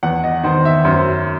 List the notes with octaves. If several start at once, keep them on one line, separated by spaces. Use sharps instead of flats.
E2 F#5
D#5
D#3 C5
E5
F#2 C5